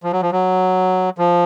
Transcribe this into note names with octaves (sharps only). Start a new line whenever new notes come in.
F3
F#3
F3
F#3
F3